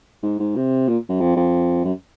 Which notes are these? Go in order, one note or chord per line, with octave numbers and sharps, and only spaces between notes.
G#2
G#2
C3
A#2
F#2
F2
F2
F#2